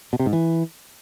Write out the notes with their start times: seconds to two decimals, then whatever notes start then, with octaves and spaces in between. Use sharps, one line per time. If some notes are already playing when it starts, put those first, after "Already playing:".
0.13 B2
0.19 C3
0.26 G#2
0.33 E3